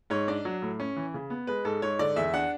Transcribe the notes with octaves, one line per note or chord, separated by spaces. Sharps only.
G#2 C#5
D4 D5
F#3
A2
C#4
E3
C#3
B3
G#3 B4
G#2 A4
G#2 C#5
D3 D5
E2 E5
D4 F#5